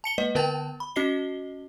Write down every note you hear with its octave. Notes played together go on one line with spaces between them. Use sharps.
A5 C#7 G7
G#3 A#3 B4 D#5
D3 B3 B4 G5 A5 A6
B5
C#4 F#4 D#5 C7 G7